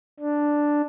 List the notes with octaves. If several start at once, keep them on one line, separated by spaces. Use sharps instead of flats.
D4